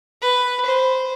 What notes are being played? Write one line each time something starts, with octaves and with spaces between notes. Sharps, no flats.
B4
C5